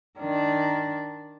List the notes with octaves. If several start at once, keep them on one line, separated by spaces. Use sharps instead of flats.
D#3 D4